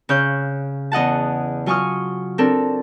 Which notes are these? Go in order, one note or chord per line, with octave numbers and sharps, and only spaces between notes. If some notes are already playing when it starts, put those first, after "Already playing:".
C#3 C#5 F5 F#6 G6
E2 D#5 F#5 A5
F#3 F4 G#5 C#6 D#6 F6
C4 D4 A4 A#4